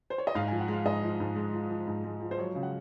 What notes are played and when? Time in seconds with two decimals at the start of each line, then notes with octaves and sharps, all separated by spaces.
0.10 C5
0.18 C#5
0.27 D#5
0.35 G#2 F5
0.48 G#5
0.52 F3
0.60 F#5
0.68 G#3
0.73 F5
0.85 G#2 D#5
1.03 F3
1.20 G#2
1.36 G#3
1.54 F3
1.70 F3
1.88 G#2
2.04 G#3
2.21 F3
2.31 C5
2.37 F#3 C#5
2.55 C#3
2.63 F#5